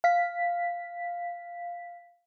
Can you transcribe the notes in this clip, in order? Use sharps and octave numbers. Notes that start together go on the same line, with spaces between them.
F5 B6